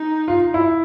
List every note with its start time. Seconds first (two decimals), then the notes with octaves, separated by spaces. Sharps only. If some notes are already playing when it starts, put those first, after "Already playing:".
Already playing: D#4
0.28 F4
0.54 E4